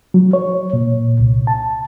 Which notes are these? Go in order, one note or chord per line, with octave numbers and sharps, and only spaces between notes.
F#3
C#5
A#2
C2
A5